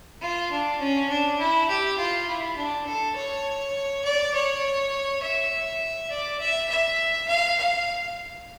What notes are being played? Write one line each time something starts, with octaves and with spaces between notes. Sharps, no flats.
F4
D4
C#4
D4
E4
G4
F4
E4
D4
A4
C#5
D5
C#5
E5
D5
E5
E5
F5
F5